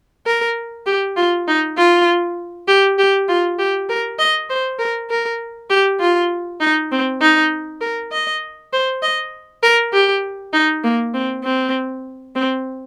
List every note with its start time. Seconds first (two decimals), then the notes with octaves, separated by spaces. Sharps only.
0.26 A#4
0.86 G4
1.16 F4
1.48 D#4
1.78 F4
2.68 G4
2.99 G4
3.29 F4
3.59 G4
3.89 A#4
4.19 D#5
4.50 C5
4.79 A#4
5.10 A#4
5.70 G4
6.00 F4
6.60 D#4
6.92 C4
7.21 D#4
7.81 A#4
8.12 D#5
8.73 C5
9.02 D#5
9.63 A#4
9.93 G4
10.53 D#4
10.84 A#3
11.14 C4
11.44 C4
12.35 C4